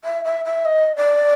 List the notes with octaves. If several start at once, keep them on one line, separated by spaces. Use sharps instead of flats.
E5
E5
E5
D#5
D5